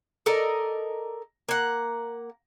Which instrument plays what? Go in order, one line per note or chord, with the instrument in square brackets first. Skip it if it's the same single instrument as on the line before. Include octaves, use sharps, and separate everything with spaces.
[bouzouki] A4 A#4 D5 D#5
A#3 F#5